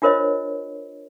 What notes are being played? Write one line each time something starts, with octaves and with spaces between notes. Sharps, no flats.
D4 F4 A#4 C5 C#5 D#5